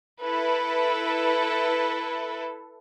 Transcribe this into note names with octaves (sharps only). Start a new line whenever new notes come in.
E4 A4 B4